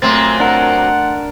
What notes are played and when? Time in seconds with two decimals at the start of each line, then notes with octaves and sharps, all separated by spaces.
0.02 A#2 F#3 A3 C4 C6 A6
0.40 D4 A#4 F#5